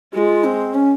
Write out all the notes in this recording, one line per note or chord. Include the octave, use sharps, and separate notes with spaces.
G#3 F4 G4
C4
C#4